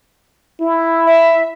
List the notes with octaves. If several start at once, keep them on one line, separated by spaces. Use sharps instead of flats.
E4
E5